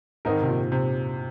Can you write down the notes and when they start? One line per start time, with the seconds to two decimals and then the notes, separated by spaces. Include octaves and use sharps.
0.25 G#2 D#3 C4 D#4 A#4
0.42 C3
0.49 A#2
0.72 C3